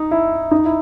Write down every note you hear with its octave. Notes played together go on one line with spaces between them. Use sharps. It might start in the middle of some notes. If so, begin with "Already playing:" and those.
Already playing: D#4
E4
D#4
E4